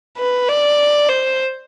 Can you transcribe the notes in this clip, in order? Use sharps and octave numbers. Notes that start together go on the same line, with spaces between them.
B4
D5
C5